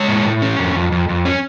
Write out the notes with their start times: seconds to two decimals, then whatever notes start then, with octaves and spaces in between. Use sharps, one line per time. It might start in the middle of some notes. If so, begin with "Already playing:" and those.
Already playing: G#3 C#5
0.08 A2
0.25 A2
0.42 C#4
0.59 F2
0.75 F2
0.92 F2
1.09 F2
1.25 C#4